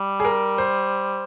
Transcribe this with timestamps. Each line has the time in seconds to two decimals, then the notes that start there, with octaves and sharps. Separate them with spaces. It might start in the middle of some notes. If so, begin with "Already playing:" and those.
Already playing: G3
0.20 G#4
0.25 A#4
0.58 C5